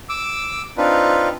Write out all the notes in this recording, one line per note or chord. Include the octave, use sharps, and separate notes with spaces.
D6 E6
C4 D4 D#4 F4 B4